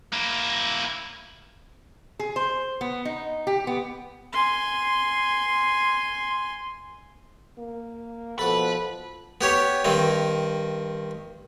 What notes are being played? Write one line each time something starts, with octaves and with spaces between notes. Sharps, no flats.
A#3 E4
G#4
C5
B3
D#4
G4
B3
G#5 C6
A#3
B2 F3 A4 B4 F#5
B3 G4 C#5
G2 D#3 C4